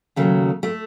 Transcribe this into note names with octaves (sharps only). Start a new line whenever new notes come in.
D#2 C#3 F#3 A3
A3